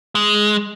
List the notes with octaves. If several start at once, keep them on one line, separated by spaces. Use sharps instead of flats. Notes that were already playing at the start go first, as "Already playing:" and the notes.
G#3